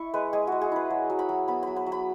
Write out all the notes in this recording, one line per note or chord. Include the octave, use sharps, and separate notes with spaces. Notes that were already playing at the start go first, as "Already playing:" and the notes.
Already playing: E4 C#6
G#3 B4
G#3 G#4
G#3 F#4
G#4
E4 B4
F#3
F#3
B5
F#3
B3 B5
F#3 B5
B5
F#3
B5